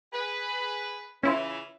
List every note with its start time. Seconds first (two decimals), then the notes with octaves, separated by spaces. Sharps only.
0.13 G#4 B4
1.23 C#3 E3 C#4 E4 F4